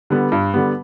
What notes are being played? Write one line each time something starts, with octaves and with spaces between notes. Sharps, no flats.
D3 G3 B3
G2
D3 G3 B3